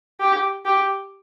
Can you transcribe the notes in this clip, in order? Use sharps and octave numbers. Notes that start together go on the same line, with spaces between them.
G4
G4